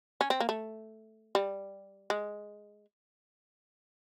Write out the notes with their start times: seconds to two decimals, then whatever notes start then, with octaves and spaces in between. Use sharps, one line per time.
0.21 C#4
0.30 C4
0.40 A#3
0.49 A3
1.35 G3
2.10 G#3